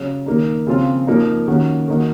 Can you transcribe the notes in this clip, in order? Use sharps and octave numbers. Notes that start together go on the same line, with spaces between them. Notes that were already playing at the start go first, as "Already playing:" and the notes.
Already playing: C#3 F#3 C#4
D#3 A#3 D#4
C#3 F3 C4 F4
F3 A#3 D#4
D#3 A#3 C#4 F#4
D#3 A#3 D#4 F#4